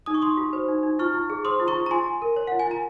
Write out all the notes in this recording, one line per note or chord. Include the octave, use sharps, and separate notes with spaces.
D#4 D#6
C#6
D#4 C6 D#6
F#4
C5
D#4
D#4
F4 C#6 F6
F4
G#4
C5 C6 D#6
F4
A#5 C#6
F4
A#5
F4 G#5 C6
F4
A#4
C#5
F4 F#5
G#5
F4 A#5